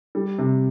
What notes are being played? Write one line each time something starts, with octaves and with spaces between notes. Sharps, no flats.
G3
C3